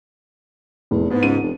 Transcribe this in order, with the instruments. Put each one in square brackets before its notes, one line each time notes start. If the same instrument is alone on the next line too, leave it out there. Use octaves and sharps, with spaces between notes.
[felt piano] F1 [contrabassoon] E2
[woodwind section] G#2 [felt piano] B3
[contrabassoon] C#2 [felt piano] D#7
[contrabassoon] F1